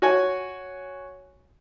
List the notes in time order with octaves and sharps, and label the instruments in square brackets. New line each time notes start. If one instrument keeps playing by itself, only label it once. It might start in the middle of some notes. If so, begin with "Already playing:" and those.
[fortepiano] F#4 C#5 G#5